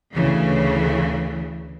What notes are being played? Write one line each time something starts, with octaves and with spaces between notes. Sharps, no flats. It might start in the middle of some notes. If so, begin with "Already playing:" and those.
D2 C#3 E3